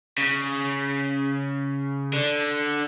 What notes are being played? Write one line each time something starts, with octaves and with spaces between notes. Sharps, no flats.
C#3
D3